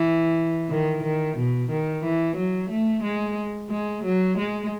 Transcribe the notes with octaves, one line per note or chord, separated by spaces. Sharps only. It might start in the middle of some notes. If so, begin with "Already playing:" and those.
Already playing: E3
D#3
D#3
B2
D#3
E3
F#3
A3
G#3
G#3
F#3
G#3